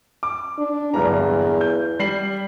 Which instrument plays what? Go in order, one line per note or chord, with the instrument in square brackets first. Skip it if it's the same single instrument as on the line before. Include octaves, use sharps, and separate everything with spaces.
[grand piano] D6
[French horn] D4
[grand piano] D1 G2 A#5 [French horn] E2
[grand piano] G6
G3 C7 F#7